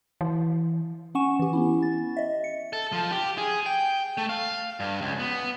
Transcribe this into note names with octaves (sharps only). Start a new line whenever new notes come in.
E3
C#4 F#5 G#5 C#6 E7
E3 G4
B3 C#4 E4
A6
D#5 E5
C#7
A4
F3
G4
G#4
G5
A3
F5
G2
C#2
B3